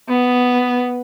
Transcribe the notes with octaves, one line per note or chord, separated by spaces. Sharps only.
B3